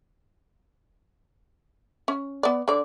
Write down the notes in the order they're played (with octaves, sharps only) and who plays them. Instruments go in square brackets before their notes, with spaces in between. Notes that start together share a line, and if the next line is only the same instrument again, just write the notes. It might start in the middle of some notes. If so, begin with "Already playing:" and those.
[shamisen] C#4
B3 D5
D3 D5